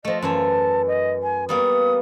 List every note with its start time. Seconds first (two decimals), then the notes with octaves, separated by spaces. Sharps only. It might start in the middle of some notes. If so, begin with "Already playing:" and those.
0.05 F3 A3 D#5
0.22 F#2 E3 E5 A5
0.87 D#5
1.23 G#5
1.49 G3 A#3 B3 D#6